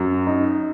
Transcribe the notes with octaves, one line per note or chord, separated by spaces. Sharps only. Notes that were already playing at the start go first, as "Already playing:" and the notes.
Already playing: F#2
D#4